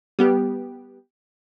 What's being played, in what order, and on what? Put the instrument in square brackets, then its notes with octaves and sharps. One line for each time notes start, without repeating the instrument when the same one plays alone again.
[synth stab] G3 B3 G4